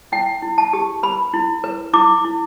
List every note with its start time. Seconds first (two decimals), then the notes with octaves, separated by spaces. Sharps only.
0.12 E4 G5
0.42 E4
0.58 A5
0.73 G4
1.03 B4 B5
1.34 E4
1.64 B4
1.93 E4 D6
2.25 E4